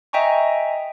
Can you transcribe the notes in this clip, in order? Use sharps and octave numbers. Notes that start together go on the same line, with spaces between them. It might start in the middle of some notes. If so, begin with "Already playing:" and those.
D#5 E5 G5 G#5 A#5 C#6